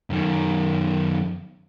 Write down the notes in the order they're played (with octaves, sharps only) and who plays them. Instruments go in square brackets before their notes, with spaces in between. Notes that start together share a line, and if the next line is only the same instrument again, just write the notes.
[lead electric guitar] F#2 D#3